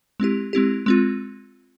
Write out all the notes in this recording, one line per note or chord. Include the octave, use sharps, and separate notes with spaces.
G#3 C4 E4 G4
G#3 C4 E4 G4
G#3 C4 F4